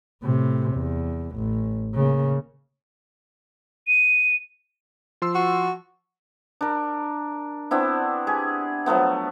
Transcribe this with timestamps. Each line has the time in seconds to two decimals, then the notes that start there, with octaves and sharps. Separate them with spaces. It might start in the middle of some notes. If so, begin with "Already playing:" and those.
0.23 A2 C3
0.75 E2
1.37 A1
1.94 C#3 A#3
3.88 D#7
5.22 F3 C6 E6
5.35 F#4
6.61 D4 A#4
7.71 B3 C4 D4 E4
8.27 G4 G#4
8.86 F3 F#3 A3 B3